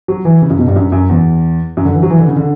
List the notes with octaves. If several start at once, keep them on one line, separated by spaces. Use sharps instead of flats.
F#3
E3
C#3
F#2
B2
G2
F#2
F#2
E2
F#2
D3
E3
F#3
E3
D3
C#3
D3